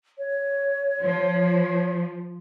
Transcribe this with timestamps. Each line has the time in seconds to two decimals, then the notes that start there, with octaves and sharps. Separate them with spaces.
0.18 C#5
1.01 F3